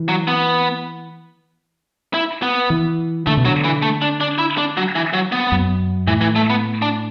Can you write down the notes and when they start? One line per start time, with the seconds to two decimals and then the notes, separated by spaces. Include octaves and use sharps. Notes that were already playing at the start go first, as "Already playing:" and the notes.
Already playing: E3
0.09 F#3
0.28 B3
2.14 E4
2.43 B3
2.70 E3
3.27 D3 A3
3.37 B2
3.45 D3 F#3
3.64 E3
3.82 A3
4.02 D4
4.21 D4
4.38 E4
4.58 D4
4.77 F#3
4.95 E3
5.13 F#3
5.32 B3
5.52 F#2
6.07 A2 E3
6.21 E3
6.36 A3
6.50 B3
6.82 D4